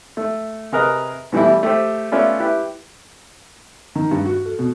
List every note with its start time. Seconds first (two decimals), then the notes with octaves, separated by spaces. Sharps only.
0.17 A3
0.72 C3 G#4 A#4 B4 D#5
1.32 B2 E3 G3 A3 E4
1.63 A3 G4 C5
2.12 A3 B3 C#4 F4 D5 E5
2.40 E4 G4 B4
3.96 D#3
4.11 G2
4.26 F#4
4.45 A4
4.59 B2